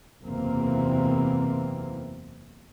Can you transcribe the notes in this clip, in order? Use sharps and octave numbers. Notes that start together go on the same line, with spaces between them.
F#1 E2 C3 E3 A#3 C4